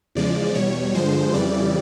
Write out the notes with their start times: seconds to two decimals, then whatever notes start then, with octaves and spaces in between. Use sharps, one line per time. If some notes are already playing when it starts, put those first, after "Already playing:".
0.15 E2 C#3 F3 G#3 D5
0.55 E2 B2 G3 C#5
0.95 G2 D3 F3 G#3 C5
1.34 F2 C#3 E3 G3 D5